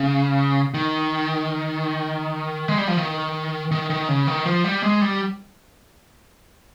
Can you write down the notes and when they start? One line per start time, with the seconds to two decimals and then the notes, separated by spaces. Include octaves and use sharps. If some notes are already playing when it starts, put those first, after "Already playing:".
Already playing: C#3
0.74 D#3
2.68 G#3
2.78 G3
2.88 F3
2.97 D#3
3.71 D#3
3.90 D#3
4.08 C#3
4.27 D#3
4.46 F3
4.64 G3
4.83 G#3
5.02 G3